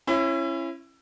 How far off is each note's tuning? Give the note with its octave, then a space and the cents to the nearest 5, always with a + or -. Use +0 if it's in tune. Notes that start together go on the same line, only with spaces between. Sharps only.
C#4 -25 E4 +25